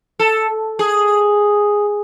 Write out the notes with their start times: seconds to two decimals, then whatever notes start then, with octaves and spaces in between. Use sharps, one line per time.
0.19 A4
0.79 G#4